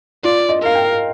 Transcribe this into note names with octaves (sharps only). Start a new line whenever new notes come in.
F4 D5
D#5
A#4 F5
G5